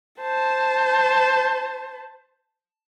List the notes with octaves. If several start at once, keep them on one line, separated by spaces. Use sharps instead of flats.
C5 A5